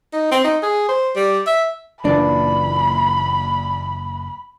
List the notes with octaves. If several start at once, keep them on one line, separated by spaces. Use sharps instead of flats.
D#4
C4
D#4
G#4
C5
G3
E5
F#1 A#2 E3 D4 B5